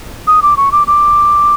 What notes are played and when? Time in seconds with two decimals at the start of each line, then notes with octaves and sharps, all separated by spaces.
0.27 D#6
0.42 D6
0.57 C#6
0.72 D6
0.87 D6